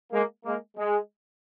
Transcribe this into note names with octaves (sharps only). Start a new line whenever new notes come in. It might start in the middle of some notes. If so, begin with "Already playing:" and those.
G#3 A#3
G#3 A#3
G#3